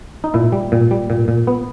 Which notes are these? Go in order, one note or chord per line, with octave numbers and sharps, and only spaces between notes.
D#4
A#2 E4
G3
A#2
G3
A#2
A#2
B3